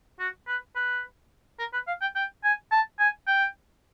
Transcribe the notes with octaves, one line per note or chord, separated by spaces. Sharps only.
F#4
B4
B4
A#4
B4
F5
G5
G5
G#5
A5
G#5
G5